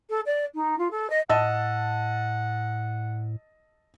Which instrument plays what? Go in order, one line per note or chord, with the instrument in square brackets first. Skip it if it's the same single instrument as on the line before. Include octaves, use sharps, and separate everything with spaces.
[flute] A4
D5
D#4
F4
A4
D#5
[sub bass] A2 [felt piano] D#5 A5 E6 [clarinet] F#5